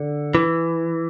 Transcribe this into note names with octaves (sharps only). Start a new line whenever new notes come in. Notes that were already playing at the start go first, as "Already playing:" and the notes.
Already playing: D3
E3